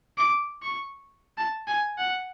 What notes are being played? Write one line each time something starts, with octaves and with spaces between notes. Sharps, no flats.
D6
C#6
A5
G#5
F#5